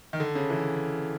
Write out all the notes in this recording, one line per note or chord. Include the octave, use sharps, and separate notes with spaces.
D#3
D3
C#3
E3